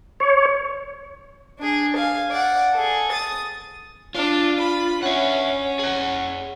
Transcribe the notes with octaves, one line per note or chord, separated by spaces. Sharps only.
C#5
D4 G#4
F5 G#5
D5 F#5
G#4 A4
D#6 A6
D4 F4
B5
C#4 E5 F#5
G#4 F#5